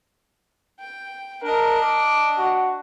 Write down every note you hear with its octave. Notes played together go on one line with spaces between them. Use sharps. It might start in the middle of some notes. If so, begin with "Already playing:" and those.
G5
D4 A#4 D#5
D6
F#4